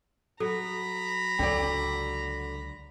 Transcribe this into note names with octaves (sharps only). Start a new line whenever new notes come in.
F#3 A4 A#5 B5
C#2 D3 F#3 D4 D5 G5